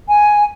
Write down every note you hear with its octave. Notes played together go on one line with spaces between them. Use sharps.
G#5